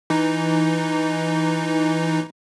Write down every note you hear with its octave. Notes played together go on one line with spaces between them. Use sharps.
E3 D#4